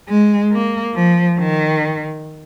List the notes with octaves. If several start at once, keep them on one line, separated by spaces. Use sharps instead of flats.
G#3
A#3
F3
D#3